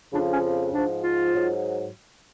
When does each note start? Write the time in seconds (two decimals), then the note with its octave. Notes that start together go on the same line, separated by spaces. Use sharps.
0.12 F2 C#3 F3 D4
0.32 C#4
0.72 G#2 F3 D4
1.02 F4
1.33 G#2 F#3